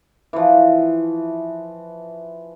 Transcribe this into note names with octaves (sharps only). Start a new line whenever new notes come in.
E3 F3